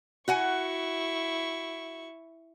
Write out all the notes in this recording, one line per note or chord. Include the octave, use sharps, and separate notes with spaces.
E4 F#4 F#5 G#5 C#6